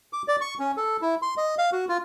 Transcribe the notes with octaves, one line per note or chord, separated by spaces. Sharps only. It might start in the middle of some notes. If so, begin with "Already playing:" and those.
D6
D5
C#6
C#4
A4
E4
C6
D#5
F5
F#4
F4